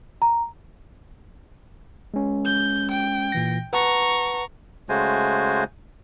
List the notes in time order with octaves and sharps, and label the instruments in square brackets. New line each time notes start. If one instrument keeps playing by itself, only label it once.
[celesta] A#5
[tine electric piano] G#3 C#4
[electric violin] G6
G5
[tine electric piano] A#2 E3 A#6
[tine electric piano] B4 F#5 A5 [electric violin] A#5 C#6
[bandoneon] C#3 G#3 A3 F#4 C5 G#5